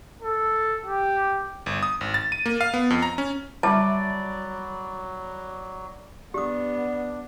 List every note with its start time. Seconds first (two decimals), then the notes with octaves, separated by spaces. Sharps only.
0.22 A4
0.86 G4
1.66 G1
1.83 D#6
2.01 G#1
2.14 A6
2.32 D#7
2.46 A#3
2.61 F5
2.74 B3
2.90 F2
3.02 A#5
3.18 C#4
3.63 F#3 G3 D5 E5 A5 B5
6.34 B3 D4 G4 D#6